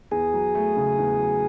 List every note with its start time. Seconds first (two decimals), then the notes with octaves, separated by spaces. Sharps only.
0.11 E2 G#4
0.33 F#3
0.55 A3
0.77 C#3
0.98 E2
1.19 F#3